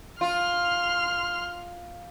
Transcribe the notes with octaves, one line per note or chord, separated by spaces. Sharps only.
F4 C6 F6